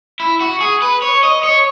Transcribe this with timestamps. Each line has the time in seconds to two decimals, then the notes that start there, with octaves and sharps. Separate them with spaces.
0.20 E4
0.41 F#4
0.61 G#4
0.82 B4
1.02 C#5
1.23 D#5
1.43 C#5